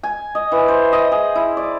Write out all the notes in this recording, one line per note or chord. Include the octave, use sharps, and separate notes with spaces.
G#5
D#5
E3
C5
D#5
G#4
E4
D5